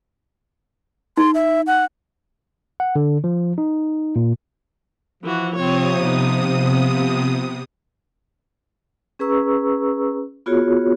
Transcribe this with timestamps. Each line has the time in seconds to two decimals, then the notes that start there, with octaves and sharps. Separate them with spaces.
1.18 D#4 C6
1.35 E5
1.67 F#5
2.80 F#5
2.96 D3
3.24 F3
3.58 D#4
4.16 A#2
5.24 E3 F3 F#4
5.55 C3 C4 C#5 D#6
6.00 B3 D#4
6.56 B3
9.19 C#4 G#4 B4 A#5 C#6 E6
10.46 B3 F4 F#4 G#4 C#5